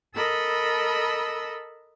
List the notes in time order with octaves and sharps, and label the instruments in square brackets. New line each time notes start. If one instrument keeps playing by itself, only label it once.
[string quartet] A4 A#4 D#5 B5 E6